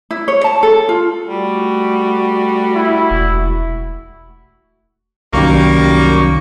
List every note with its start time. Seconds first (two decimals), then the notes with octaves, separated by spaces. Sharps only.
0.11 E4
0.28 C#5
0.44 A5
0.63 A4
0.89 F4
1.28 G3 A3 F#4
2.75 E4
3.10 E1
5.33 C2 F#2 D#3 G3 A#3 C#6